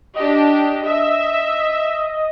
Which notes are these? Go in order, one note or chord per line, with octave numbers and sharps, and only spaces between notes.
D4 G4 D#5
E5